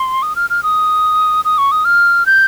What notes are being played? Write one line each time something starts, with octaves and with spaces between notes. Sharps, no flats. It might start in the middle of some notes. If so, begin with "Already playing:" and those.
Already playing: C6
D#6
F6
F6
D#6
D#6
C#6
D#6
F6
G6